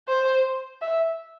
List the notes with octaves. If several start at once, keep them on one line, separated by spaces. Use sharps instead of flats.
C5
E5